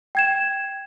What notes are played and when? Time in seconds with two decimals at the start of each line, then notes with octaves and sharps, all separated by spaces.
0.15 G5 G#6 E7